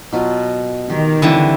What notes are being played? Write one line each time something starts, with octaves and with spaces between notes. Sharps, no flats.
B2 F#3 F4
D#3 G4
D3 E3 G3 C4 E4